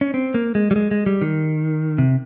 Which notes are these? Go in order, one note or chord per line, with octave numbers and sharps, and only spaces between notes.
C#4
C4
A#3
G#3
G3
G#3
G#3
G3
D#3
C3